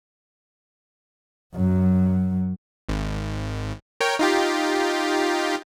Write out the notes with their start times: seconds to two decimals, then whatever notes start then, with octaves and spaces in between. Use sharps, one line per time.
1.54 F#2 F#3
2.89 G#1
4.00 A#4 C#5 G5
4.19 D#4 F4 G4